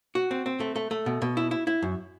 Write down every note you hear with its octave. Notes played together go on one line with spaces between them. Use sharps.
F#4
C4
C4
A3
A3
A3
B2
B2
E4
E4
E4
F#2